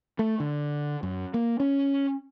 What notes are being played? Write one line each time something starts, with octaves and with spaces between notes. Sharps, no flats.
A3
D3
F#2
A#3
C#4